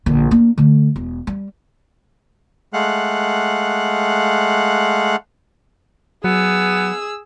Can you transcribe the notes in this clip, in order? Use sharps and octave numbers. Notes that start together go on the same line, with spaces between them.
A#1 D3
A#3 D4
D3 A3
E1
G3
G#3 A3 F5 F#5 F#6
F#3 B3 G#4 E6